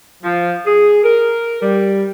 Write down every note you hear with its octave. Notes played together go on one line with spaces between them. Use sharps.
F3
G#4
A#4
G3